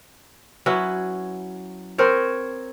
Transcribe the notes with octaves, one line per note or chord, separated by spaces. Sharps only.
F#3 C#4 E4 B4
C4 A#4 C5 C#5